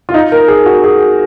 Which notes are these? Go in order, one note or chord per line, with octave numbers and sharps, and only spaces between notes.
F4
D#4
A#4
G#4
F#4
G#4